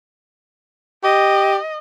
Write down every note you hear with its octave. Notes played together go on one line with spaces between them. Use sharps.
G4 D#5